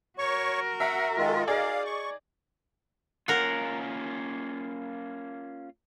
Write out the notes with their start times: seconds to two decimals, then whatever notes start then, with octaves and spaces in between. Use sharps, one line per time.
0.19 F#4 A#4 C#5 C#6
0.80 E5 F#5 A#5
1.17 D#3 G#3 F4
1.47 D#4 G#4 D5 F5
1.85 C#6
3.28 A#3 C#4 F4 A#4 F#5